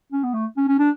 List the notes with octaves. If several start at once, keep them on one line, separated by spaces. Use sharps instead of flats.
C#4
B3
A3
C#4
C#4
D4